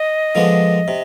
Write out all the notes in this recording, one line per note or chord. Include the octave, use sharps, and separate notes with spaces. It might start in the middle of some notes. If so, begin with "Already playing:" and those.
Already playing: D#5
D3 F3 G#3 B3 D4
C3